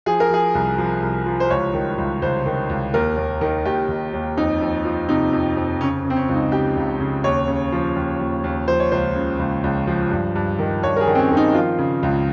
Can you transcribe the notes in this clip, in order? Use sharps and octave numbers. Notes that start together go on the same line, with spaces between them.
F3 G#4
A#4
F3 G#4
C2
F3
C2
F3
C5
C#2 C#5
D#3
C#2
C#2 C5
D#3
C#2
D#2 A#4
D#2
D#3
D#2 G4
D#3
D#2
F2 D#4
F2
F3
C3 D#4
F2
F2
C#3 C#4
C#3
C4
C#4
C#2
D#4
C#3 G4
C#2
C#3
D#2 C#5
C#3
F3
D#2
D#2
D#2
F3 C5
C#5
C#2 C5
C#3
C#2
C#2
F3
G2
G2
D#3
G2 C#5
A#4
G#4
D#3
C4
C#4
D#3
D#4
F3 F4
C#3
C#2